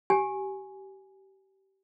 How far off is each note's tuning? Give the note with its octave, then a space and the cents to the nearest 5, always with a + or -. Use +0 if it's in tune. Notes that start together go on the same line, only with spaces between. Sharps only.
G4 -25 G#5 +0